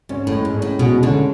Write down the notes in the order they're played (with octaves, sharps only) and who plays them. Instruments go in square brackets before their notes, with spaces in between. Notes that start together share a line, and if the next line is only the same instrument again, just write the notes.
[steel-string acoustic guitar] G#2 [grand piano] C#4
[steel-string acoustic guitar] A2
[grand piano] G#3
[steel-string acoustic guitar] G#2
[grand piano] C#4
[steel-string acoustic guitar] A2
[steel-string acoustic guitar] B2 [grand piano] G#3
[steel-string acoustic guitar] D2 D3 [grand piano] C#4